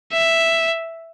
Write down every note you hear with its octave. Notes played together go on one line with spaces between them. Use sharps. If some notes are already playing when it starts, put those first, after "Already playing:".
E5